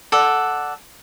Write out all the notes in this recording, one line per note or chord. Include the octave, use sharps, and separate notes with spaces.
A4 D5 F#5